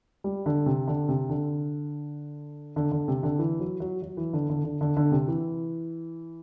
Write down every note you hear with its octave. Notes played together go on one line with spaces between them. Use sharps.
G3
D3
C3
D3
C3
D3
D3
D3
C3
D3
E3
F#3
F#3
F#3
E3
D3
D3
D3
D3
D3
C3
E3